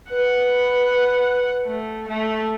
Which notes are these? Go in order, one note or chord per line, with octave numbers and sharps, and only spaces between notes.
B4 F#5
A3
A3